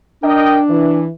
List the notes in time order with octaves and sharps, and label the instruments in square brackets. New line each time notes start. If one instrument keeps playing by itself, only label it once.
[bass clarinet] D4 [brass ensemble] A#4 D#5 G5
[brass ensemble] E3